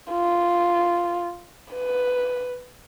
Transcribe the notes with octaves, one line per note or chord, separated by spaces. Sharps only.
F4
B4